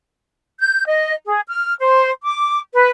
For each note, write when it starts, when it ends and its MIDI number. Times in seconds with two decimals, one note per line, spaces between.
0.59 0.84 91
0.85 1.12 75
1.27 1.41 68
1.49 1.74 89
1.79 2.11 72
2.23 2.59 86
2.73 2.89 71